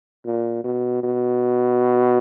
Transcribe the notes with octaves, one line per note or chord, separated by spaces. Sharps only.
A#2
B2
B2